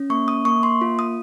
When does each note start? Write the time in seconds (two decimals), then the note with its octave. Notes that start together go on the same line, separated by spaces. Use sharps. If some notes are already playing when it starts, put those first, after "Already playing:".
Already playing: C#4
0.10 A#3 C#6
0.28 D#6
0.45 A#3 C#6
0.63 C6
0.81 F4
0.99 D#6